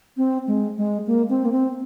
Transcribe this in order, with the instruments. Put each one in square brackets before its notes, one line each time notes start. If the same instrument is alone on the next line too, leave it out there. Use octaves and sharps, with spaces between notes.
[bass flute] C4
G#3
G#3
A#3
C4
A#3
C4